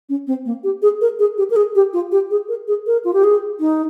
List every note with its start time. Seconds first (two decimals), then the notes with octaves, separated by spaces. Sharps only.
0.09 C#4
0.27 C4
0.45 A#3
0.64 G4
0.82 G#4
1.01 A#4
1.19 G#4
1.38 G4
1.50 A#4
1.56 G#4
1.75 G4
1.93 F4
2.12 G4
2.31 G#4
2.49 A#4
2.68 G#4
2.87 A#4
3.05 F4
3.13 G4
3.24 G#4
3.60 D#4